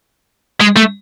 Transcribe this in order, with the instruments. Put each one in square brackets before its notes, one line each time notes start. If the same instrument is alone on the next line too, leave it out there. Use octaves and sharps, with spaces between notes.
[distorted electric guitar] G#3
A3